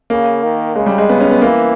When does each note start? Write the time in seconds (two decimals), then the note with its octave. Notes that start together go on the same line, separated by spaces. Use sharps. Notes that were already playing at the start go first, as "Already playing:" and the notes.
0.10 C#3 A#3
0.43 D#3
0.75 C#3 G#3
0.86 G3
0.98 G#3
1.09 C#3 B3
1.20 C#4
1.31 B3
1.42 E3 A#3